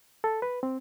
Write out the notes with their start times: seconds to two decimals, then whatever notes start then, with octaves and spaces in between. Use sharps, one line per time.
0.24 A4
0.42 B4
0.63 C4